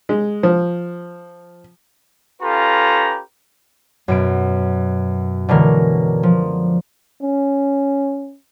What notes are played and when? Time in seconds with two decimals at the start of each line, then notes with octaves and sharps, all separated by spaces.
0.09 G#3
0.43 F3
2.42 C#4 F4 G4 A4 B4 A#5
4.08 F#2 B2 D7
5.49 B2 D3 E3 G#3 C#4 A#4
6.23 F3
7.22 C#4